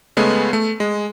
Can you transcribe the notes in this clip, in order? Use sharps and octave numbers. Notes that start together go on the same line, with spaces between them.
C#3 G#3 A3 B3
A3
G#3